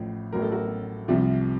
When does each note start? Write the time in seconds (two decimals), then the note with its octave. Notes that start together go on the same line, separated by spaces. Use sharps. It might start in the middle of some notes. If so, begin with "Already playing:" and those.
Already playing: A1 A2 F3
0.33 A1 A2 F#3 A#4
0.42 A4
0.52 F#4 A#4
1.08 C2 C3 F3